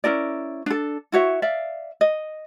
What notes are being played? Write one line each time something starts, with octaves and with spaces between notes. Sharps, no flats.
C#4 E4 A#4 D5
D4 A4
E4 F#4 C#5 E5
D5 E5 F5
D#5